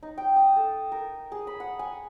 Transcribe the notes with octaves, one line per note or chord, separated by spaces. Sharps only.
D#4
G5
D#6
A4
A#4
G#4
B5
F#5
G#5